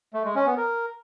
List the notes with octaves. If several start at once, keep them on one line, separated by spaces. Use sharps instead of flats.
A3
G#3
C#4
B3
A#4